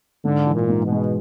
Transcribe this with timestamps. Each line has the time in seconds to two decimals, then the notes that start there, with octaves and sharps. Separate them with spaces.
0.25 G#2 D3
0.47 E3
0.55 A#2
0.70 G#2
0.85 B2
0.92 G#3